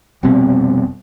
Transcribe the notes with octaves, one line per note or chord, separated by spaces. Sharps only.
F1 B2 G3 C4